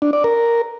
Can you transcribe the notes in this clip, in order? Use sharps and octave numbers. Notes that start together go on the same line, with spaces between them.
D4
D5
A#4